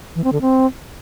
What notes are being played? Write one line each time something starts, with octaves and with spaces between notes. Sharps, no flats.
E3
C4
D3
C4